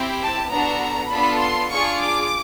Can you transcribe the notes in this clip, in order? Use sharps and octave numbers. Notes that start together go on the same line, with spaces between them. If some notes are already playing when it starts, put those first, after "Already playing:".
Already playing: C4 E4 G4
A5
B3 D4 F#4 A4 A#5
B3 D4 F4 A4 B5
C6
D4 F4 G#4 C#6
D6